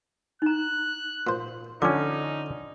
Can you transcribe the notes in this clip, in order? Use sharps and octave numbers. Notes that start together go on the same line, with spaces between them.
D#4 A#5 F#6
A#2 C5
F2 D3 C#4 D#4 F4 D6